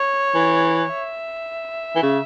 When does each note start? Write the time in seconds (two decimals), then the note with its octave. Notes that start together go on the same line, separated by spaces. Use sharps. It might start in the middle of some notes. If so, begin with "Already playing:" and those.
Already playing: C#5
0.35 E3
0.91 E5
1.96 E3
2.03 C#3